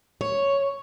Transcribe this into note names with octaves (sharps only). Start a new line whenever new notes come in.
C#5